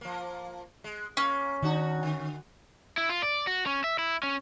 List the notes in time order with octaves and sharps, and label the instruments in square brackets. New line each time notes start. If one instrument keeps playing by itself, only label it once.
[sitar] F3 A#3
G#3
[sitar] A#3 [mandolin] C#4
[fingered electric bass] D#3 [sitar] D4 D#4 F#4
[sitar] D3
[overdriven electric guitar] E4
F4
D5
F#4
C#4
E5
E4
C#4